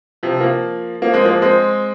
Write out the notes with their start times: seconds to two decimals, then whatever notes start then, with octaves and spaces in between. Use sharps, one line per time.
0.23 C3 F3
0.40 F3 A#3
1.02 F3 A#3
1.13 G#3 C4
1.25 F3 A#3
1.42 G#3 C4